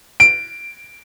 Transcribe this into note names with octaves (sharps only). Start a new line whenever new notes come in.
D7